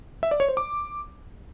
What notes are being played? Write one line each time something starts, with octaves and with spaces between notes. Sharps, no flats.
E5
D5
C#5
C5
D6